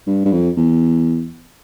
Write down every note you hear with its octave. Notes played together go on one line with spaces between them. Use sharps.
G2
G2
F2
E2